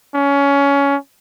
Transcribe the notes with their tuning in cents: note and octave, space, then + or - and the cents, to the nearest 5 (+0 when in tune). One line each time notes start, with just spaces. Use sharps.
C#4 +20